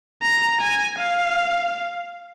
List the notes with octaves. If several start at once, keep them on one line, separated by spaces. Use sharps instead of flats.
A#5
G#5
F5